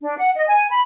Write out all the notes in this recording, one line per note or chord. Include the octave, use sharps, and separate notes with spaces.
D4
F#5
D#5
G#5
B5